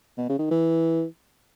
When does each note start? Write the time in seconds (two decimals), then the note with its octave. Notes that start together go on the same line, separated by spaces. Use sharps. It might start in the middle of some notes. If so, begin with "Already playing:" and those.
0.17 B2
0.29 C#3
0.39 D#3
0.51 E3